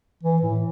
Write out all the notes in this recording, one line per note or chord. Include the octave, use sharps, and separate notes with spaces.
E3
A2